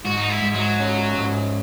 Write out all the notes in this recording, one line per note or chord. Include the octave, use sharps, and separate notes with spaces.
G#2 F#4
D#4
E4
G#2
F#3
C#4
G#2